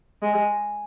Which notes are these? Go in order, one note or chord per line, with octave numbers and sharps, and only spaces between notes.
G#3